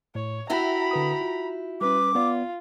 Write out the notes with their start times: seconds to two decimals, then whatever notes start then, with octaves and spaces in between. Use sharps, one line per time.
0.15 A2 C#5
0.50 E4 F#4 G4 E5 A#5 B5
0.91 D3 B4 D#6
1.21 F4
1.81 G3 C#4 B4 D6
2.15 B3 F4 D5